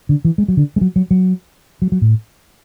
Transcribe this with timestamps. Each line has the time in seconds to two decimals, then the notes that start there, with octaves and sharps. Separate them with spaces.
0.09 D3
0.25 E3
0.38 G#3
0.48 F#3
0.57 D3
0.76 G#3
0.81 F#3
0.96 F#3
1.11 F#3
1.82 F#3
1.92 F#3
2.01 A2